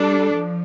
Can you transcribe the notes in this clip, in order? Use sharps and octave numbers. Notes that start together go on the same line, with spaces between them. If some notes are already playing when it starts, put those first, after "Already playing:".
Already playing: G3 D4 A4
F3